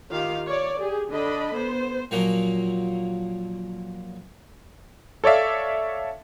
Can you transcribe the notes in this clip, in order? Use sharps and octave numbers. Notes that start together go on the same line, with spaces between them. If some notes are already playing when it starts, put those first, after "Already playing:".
D#3 F4 G4 F5
C#5 D5
G4 G#4
D3 D4 D#5 B5
B3 C5
A#2 F3 F#3 A#3
A4 C#5 D5 E5 F5